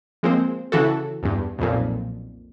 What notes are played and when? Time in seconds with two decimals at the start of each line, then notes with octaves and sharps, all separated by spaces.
0.23 F3 G#3 A#3 C4 C5
0.72 C#3 E3 F#4 A4
1.23 E2 G2
1.59 B1 F2 A#2